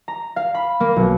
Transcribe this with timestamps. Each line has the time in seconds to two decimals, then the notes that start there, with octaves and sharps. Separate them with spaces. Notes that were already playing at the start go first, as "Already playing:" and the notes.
0.08 A#5
0.36 F5
0.55 B5
0.80 A#3
0.96 B1